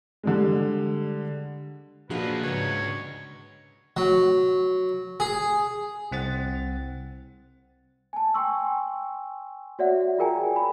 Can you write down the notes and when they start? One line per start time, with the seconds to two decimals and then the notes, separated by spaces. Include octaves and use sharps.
0.24 D3 G3 G#3
2.10 F3 A#3 D4 F#4 G#4 B4 D#5 F5
2.43 G#2 C#3 B4 C#5 D#5
3.97 F#3
5.20 G#4
6.12 C2 C4 F#5 A6
8.13 G#5 A5
8.34 G5 G#5 C6 C#6 E6
9.79 F#4 C#5 D5 E5 F#5
10.19 F4 G#4 A#4 G5 G#5 A#5
10.56 B5